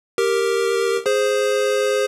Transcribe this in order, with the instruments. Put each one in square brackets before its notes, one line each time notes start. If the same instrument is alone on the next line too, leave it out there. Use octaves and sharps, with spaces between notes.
[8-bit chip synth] G4 A#4
G#4 C5